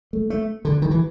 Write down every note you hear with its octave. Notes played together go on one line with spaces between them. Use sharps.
A3
A3
D3
D#3
E3